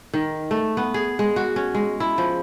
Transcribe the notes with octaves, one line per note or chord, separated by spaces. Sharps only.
D#3
A3
B3
G#4
G#3
F#4
C#4
G#3
E4
F3